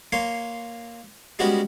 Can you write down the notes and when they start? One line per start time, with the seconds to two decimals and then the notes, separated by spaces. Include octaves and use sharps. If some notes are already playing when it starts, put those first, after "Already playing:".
0.12 A#3 C#5 C6
1.39 G3 G#3 B3 C#4 F#4